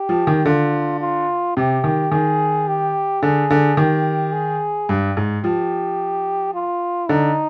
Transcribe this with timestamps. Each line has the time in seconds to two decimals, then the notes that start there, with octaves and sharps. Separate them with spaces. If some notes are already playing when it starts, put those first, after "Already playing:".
Already playing: G4
0.09 F3
0.27 D#3
0.45 D3 F4
1.01 F4
1.57 C3 G4
1.84 D#3
2.11 D#3 G#4
2.68 G4
3.22 D3 G#4
3.50 D3
3.77 D#3 G4
4.33 G#4
4.89 G2
5.17 G#2
5.44 F3 G4
6.54 F4
7.09 D3 D#4